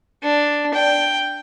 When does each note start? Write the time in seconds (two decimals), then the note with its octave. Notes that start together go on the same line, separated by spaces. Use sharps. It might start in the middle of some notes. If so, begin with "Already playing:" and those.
0.23 D4
0.74 G5